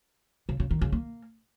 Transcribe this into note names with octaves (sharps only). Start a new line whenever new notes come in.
C#3
C#3
D#3
C#3
A#3